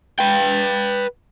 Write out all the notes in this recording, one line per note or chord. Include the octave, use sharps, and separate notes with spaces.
B4 G5